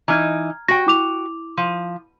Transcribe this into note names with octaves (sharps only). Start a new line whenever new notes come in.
E3 D#4 A#5 F6 G#6
F#4 G5 A#6
E4 D6 F7
F3